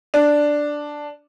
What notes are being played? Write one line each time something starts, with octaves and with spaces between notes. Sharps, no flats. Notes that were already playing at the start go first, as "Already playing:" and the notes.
D4